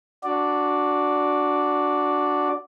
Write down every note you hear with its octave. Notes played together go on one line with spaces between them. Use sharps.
D4 F#4 D5